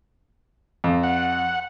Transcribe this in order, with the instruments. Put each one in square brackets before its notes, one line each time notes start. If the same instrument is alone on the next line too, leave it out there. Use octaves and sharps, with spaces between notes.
[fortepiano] F2
[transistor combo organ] F#5